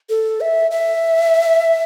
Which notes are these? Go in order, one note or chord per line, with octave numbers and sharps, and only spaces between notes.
A4
E5
E5